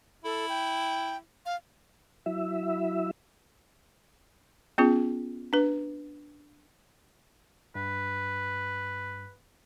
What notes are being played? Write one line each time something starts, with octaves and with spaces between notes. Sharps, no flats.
E4 A4
G5
F5
F#3 E4 E5
B3 C#4 F4 G#4
D4 B4
G2 B4